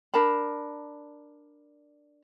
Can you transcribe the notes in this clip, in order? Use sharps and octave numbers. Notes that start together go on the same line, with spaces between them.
D4 A#4 A5 B5